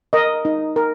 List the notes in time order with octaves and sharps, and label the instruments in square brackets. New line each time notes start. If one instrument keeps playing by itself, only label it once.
[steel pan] A#4 D#5
D#4
A#4